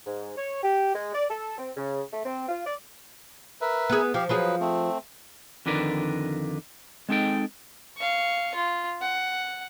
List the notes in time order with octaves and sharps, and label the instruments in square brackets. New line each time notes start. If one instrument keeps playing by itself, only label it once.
[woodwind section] G#2
C#5
G4
G#3
D5
A4
C4
C#3
A3
C4
F4
D5
[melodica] A#4 B4 E5
[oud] B3 G#4
[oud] F3 [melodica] G4 F5
[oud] F3 F4 G#4 [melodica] F#3 B4
[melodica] A3 C4
[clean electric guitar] F2 D3 D#3 A#4 B4 D5
G#3 C4 D#4 A4 G5
[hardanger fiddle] F5 C#6
F4
F#5